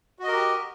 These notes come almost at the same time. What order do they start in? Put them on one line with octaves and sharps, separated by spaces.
F#4 D#5 A#4 G4